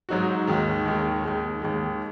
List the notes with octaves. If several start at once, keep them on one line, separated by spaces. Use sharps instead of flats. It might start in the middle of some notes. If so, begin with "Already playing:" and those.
G#2 F#3 D#4 F#4
D#2 D#3 G#3
D#2 D#3 G#3
D#2 D#3 G#3
D#2 D#3 G#3